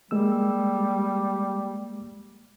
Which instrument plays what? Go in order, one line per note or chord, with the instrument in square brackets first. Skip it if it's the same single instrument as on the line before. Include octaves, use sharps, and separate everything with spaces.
[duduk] G3 [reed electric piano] G#3 A#3 E6